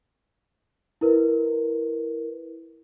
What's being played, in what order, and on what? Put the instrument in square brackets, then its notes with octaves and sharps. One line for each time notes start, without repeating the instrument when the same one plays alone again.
[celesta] E4 A#4 B4